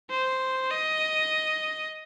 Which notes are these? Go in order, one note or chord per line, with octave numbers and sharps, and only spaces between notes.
C5
D#5